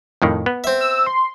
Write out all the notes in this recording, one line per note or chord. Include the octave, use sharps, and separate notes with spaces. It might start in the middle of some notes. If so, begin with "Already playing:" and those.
F2 A2 D#3
B3
C4 E5
E6
C6